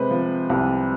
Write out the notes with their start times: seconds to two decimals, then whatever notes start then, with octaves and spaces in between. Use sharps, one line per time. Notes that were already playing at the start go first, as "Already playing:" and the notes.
Already playing: C3 G#3 B4 C5
0.11 F3
0.50 C2